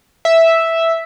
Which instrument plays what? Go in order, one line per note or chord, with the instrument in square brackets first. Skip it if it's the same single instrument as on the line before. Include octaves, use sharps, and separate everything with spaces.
[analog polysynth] E5